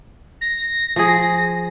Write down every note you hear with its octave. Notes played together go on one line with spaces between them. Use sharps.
A#6
F3 G#4